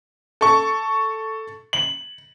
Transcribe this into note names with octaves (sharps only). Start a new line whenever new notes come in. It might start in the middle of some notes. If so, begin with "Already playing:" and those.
A4 C#6
F#7